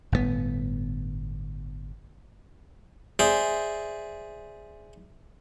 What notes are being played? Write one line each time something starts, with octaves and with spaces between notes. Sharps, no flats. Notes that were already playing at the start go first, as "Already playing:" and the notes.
G1 A2 D3 B3
G#4 C5 D5 E5